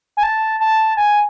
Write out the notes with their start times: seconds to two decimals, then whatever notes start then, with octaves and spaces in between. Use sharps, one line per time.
0.17 G#5
0.23 A5
0.60 A5
0.97 G#5